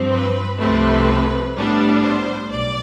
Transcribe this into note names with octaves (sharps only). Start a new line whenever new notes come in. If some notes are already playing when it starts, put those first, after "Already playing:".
Already playing: G2 F3 C4
B4
C2 C3 F3 A3 C4 B4
A2 G3 B3 D4
C5
B1 D5